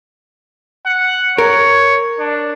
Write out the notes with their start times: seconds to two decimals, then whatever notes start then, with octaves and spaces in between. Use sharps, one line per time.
0.86 F#5
1.38 A#4 C#5
2.20 D4